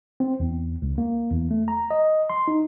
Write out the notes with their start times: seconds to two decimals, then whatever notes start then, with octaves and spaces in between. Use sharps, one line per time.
0.20 C4
0.40 E2
0.82 C#2
0.98 A#3
1.31 E2
1.51 A3
1.68 A#5
1.91 D#5
2.30 C6
2.48 D#4